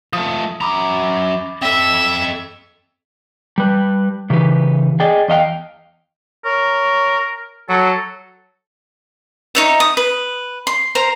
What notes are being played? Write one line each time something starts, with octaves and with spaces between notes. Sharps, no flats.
F3 A3 D#6
F#2 A#5 B5 D6 D#6
C4 A4 E5
G3 B4
C#3 E3 D#4 G4 B4
G#4 D5 D#5 G5
E2 D#5 F5 G5
A#4 C#5
F#3 A4
D#4 C#5 E5
D#6
B4
C6
A#4 C5 A#5